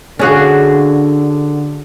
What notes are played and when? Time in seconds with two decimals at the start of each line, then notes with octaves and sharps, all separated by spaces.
0.19 D3 C#4 D4 F#4 G#4 F5